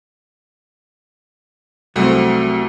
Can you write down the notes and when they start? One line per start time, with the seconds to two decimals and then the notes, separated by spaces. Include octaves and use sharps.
1.96 C2 F#3 A3 C4